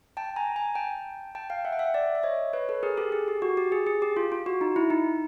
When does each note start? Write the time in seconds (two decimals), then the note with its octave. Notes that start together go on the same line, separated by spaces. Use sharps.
0.17 G5 A5
0.36 G#5 A#5
0.56 G#5 A#5
0.75 G5 A5
1.35 G5 A5
1.50 F5 G5
1.65 E5 F#5
1.73 G5
1.79 E5 F#5
1.94 D5 E5
2.15 E5
2.23 C#5 D#5
2.53 B4 C#5
2.69 A4 B4
2.83 G#4 A#4
2.97 G4 A4
3.12 G#4
3.28 G4
3.42 F#4
3.57 G4
3.72 G#4
3.87 G#4
4.02 G4
4.17 F4
4.32 F4
4.46 F#4
4.61 D#4
4.76 E4
4.90 D#4